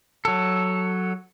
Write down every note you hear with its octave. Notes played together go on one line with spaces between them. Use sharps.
F#3 A4